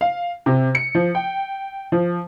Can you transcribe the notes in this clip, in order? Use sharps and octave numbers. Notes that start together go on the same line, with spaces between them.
F5
C3
C#7
F3
G5
F3